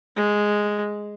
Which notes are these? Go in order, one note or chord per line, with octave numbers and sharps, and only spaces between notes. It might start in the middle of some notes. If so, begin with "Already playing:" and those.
G#3